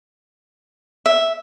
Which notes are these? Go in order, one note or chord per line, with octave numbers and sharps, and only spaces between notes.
E5